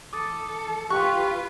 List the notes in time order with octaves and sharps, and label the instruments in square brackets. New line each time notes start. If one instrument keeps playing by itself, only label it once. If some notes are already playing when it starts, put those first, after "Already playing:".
[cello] E3 A4 [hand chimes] D6 D#6 A6
[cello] F4 B4 [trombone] G4 [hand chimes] C6 F#6 [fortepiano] C#6